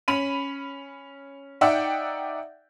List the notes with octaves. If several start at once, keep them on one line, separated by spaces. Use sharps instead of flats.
C#4 B5 D#7
D#4 D5 E5 F#5 G5